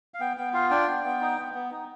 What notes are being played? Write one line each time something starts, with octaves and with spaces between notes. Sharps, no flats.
F5
B3 G5
B3 G5
F4 F5
D4 G5
B3
B3
D#4
B3
B3
D#4